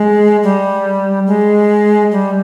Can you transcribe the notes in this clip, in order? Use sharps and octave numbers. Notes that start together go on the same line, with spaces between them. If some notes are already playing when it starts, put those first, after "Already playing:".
Already playing: G#3
G3
G#3
G3